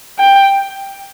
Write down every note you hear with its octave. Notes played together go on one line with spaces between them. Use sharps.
G5